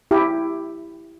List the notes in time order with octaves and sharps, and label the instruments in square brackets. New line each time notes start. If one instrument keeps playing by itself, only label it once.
[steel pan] E4 G4